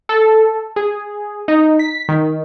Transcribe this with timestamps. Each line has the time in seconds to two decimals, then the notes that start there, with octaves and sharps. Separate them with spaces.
0.09 A4
0.76 G#4
1.48 D#4
1.79 B6
2.09 D#3